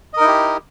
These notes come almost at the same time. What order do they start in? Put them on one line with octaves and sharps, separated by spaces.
D#5 A#4 D#4 E4 G4